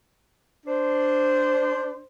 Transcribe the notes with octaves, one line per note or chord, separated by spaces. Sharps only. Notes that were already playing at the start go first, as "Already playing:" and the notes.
D4 C5